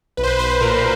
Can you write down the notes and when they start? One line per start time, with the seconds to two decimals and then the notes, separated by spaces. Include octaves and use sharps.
0.17 B1 B4
0.23 C5
0.28 B4
0.39 B1 C5
0.50 B4
0.61 A#2 A#4